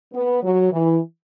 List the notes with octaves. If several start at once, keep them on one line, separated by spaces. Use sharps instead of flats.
B3
F#3
E3